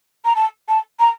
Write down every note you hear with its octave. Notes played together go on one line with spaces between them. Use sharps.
A#5
A5
A5
A#5